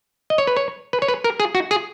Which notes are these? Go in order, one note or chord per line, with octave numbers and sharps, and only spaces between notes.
D#5
C#5
B4
C#5
B4
C#5
B4
A#4
G#4
F#4
G#4